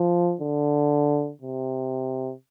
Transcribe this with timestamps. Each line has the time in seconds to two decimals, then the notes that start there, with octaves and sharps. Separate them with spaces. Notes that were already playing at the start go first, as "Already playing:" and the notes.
Already playing: F3
0.41 D3
1.42 C3